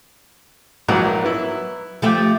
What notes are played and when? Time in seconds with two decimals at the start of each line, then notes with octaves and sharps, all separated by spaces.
0.88 A#1 G#2 E3 F#3 A#4
1.24 B3 E4
2.02 F3 A3 G4